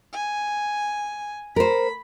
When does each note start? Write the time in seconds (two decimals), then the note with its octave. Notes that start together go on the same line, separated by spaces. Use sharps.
0.13 G#5
1.56 A#4 C5 B5